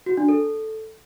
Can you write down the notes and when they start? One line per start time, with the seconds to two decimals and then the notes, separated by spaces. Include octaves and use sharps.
0.06 F#4
0.17 D4
0.29 A4